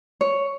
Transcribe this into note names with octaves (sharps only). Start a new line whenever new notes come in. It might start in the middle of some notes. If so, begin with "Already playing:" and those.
C#5